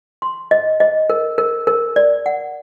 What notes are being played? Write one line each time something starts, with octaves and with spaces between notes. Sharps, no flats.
C6
D#5
D#5
A#4
A#4
A#4
D5
F#5